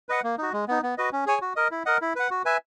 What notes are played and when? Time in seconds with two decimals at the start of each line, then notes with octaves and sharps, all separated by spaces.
0.09 B4 D#5 F#5
0.24 A#3
0.38 D#4 F#4
0.53 G#3
0.68 B3 D#4
0.83 B3
0.98 F#4 B4 D#5
1.13 C#4
1.26 G#4 C#5 G#5
1.41 F#4
1.56 A#4 D#5
1.71 E4
1.86 A#4 D#5 F#5
2.02 E4
2.16 B4 F#5
2.31 F#4
2.45 B4 E5 G#5